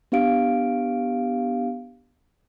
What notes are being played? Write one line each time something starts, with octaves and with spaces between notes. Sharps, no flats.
B3 D4 G4 F5 D7